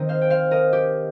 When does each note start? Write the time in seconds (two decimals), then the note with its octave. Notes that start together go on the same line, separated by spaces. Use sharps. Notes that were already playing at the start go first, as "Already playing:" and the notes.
Already playing: D#3 C4 D#4 D#5
0.09 C5 F5
0.21 G5
0.30 C5 F5
0.51 A#4 D#5
0.73 G4